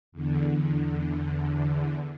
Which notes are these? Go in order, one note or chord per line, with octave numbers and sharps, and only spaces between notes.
E2 D3